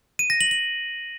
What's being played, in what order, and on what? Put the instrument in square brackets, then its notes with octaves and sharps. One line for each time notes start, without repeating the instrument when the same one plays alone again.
[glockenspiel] D#7
A#6
F#7
F#7